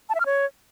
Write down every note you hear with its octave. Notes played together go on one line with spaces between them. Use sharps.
A5
E5
F6
C#5